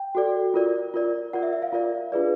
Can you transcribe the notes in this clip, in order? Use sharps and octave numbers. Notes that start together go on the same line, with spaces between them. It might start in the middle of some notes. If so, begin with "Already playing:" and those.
Already playing: G5
F#4 A4 D5
F4 A#4 D5
F4 A#4 D5
F4 A#4 D5 F#5
E5
E5
F5
F4 A#4 D5
D4 F4 G#4 B4 D5